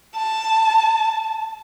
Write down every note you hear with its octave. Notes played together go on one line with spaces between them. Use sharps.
A5